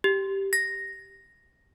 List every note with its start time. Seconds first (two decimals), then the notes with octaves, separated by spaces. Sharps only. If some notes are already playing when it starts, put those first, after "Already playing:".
0.04 G4
0.53 A#6